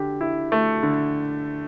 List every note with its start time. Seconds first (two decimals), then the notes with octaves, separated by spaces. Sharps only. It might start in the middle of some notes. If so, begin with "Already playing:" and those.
Already playing: D3 G4
0.21 E4
0.52 A3
0.83 D3